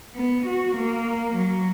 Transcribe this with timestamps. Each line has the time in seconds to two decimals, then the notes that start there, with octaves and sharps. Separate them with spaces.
0.15 B3
0.46 F#4
0.76 A#3
1.35 F#3